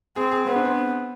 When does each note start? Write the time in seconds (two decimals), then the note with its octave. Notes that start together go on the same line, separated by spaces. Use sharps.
0.16 C4 G#4
0.31 G#4
0.47 B3 C4
0.56 D4
0.65 C4